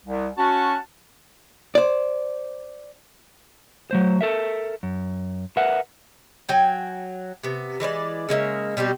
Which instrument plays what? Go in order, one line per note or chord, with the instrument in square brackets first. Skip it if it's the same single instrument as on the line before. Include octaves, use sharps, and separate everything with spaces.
[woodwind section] C2
C#4 F#4 A5
[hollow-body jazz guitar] C5 D5
[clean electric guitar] F#3 A3 C5
A4 A#4 E5
F#2
A#4 B4 E5 F#5
[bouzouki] F#3 G5 G#5
C3 B3
E3 G#3 B4 D5
C#3 G#3 A#3 E5
B2 G3 C4 G4